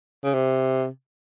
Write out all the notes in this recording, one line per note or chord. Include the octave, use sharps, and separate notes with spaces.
C#3
C3